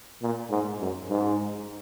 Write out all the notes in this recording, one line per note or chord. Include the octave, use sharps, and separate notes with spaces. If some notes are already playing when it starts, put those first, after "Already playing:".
A#2
G#2
F#2
G#2